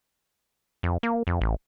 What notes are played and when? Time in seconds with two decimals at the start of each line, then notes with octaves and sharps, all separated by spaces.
0.83 F2
1.03 A#3
1.27 F2
1.41 A1